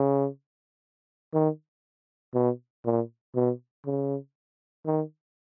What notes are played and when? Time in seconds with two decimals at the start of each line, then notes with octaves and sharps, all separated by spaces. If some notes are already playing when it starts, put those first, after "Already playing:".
Already playing: C#3
1.34 D#3
2.34 B2
2.85 A#2
3.35 B2
3.86 C#3
4.86 D#3